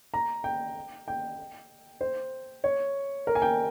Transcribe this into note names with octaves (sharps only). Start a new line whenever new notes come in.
A#5
G5
G5
C5
C#5
A#4
G#5
G5